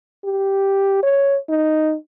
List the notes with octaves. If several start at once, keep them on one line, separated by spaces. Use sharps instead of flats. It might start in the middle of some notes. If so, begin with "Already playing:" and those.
G4
C#5
D#4